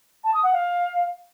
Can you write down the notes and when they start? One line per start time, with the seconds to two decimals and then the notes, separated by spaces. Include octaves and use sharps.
0.24 A5
0.34 D#6
0.43 F#5
0.53 F5